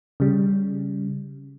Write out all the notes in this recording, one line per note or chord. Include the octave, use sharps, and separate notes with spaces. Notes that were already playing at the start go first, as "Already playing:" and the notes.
C#3 G3